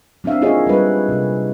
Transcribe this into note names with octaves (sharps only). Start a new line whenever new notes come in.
F#3 C4 D4 E5 F5
A#3 D#4 F4 G#4 C#5 D#5
G3 G#3 B4
C3